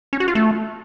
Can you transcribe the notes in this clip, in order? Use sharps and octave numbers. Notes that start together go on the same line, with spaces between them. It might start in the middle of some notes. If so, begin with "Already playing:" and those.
C#4
F#4
F4
A3